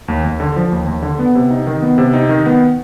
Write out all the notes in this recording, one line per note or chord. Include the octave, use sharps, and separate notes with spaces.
D#2
D#2
D3
F3
D#2
D#2
D3
B3
C3
D#4
D#3
B3
C3
D#4
D#3
B3